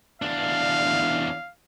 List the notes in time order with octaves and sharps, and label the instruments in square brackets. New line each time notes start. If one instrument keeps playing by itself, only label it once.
[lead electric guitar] E2 D4 [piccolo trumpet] F5